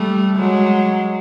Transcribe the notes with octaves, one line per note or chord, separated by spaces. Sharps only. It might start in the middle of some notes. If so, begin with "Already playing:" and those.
Already playing: G3 A3
F#3 G#3